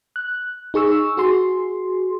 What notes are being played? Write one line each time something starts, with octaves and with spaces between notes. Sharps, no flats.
F#6
D#4 G#4 C#6 E6
F#4 G#4 C6